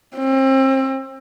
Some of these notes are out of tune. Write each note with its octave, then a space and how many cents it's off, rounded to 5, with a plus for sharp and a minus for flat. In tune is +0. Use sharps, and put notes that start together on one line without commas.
C4 +35